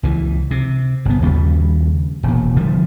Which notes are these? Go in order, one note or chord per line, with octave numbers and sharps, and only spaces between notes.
C#2 E3
C3
G1 B3
D#2 C#3 G3
E1 A#2
D3 F3 G3 A3